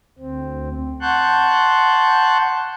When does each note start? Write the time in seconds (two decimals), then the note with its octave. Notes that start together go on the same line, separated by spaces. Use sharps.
0.19 D2 C4
1.01 F#5 A5 C6 C#6 F#6 G6